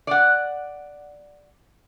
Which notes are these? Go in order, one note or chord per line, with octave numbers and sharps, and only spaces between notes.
D5 F#5